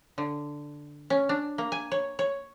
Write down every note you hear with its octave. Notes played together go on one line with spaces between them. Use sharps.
D3
C#4
D4
A#3
G#5
C#5
C#5